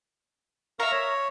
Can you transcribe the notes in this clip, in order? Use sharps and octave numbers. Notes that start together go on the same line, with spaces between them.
A#4 E5 F5 A#5 C#6
C#5